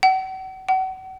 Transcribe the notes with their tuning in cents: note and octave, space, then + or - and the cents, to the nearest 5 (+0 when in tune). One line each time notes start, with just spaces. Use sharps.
F#5 +40
F#5 +35